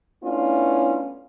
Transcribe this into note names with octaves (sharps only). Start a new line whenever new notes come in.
A3 B3 C#4 D4 E4 F4